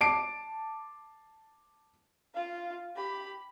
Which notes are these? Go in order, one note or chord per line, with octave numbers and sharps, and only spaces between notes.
A5 D6 C7 D7
F4 F5
G4 B5